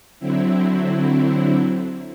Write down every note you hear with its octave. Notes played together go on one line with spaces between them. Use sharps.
D3 F#3 C4 E4